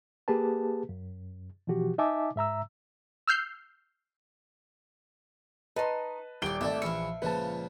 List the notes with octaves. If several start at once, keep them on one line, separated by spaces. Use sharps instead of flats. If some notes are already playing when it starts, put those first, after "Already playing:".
A#3 G4 G#4 B4 A5
F#2
B2 E3 F3 F#4 G4
D#4 D#5 E5 G#5 A5 D6
G#2 E5 A#5 E6
E6 F6 G6 C7
D#4 B4 D#5 A5 C6
D#1 G4 D5 G5 D7 G7
G#1 A3 A4 D5 E5
A#1 E3 E5 F5 C#7
C#2 A#2 F3 B4 A5